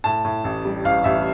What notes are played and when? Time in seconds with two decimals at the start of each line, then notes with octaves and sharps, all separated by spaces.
0.04 A2 A5
0.25 A2
0.44 A1
0.65 G3
0.85 A1 F5
1.04 A1 E5